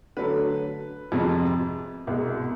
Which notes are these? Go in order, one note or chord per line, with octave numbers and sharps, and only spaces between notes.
D3 F#3 A3 B4
F2 C3 F3 G#3
C2 B2 G#3